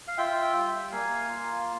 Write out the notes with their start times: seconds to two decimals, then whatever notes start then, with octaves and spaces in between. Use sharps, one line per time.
0.08 F5
0.18 F4 E5 G5
0.54 G3
0.92 A#3 F5 G#5
1.28 F4